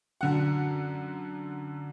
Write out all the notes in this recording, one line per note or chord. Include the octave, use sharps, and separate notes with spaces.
F#2 D3 F#5